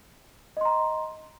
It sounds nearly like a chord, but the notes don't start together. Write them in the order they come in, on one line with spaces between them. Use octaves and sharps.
D#5 C6 A#5